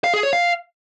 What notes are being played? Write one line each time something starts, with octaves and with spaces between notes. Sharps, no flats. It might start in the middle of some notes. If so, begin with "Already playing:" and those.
F5
G#4
C#5
F5